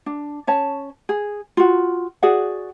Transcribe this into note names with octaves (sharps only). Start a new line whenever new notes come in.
D4
C#4 C#5 A5
G#4
F4 F#4
F#4 G#4 D5 F#5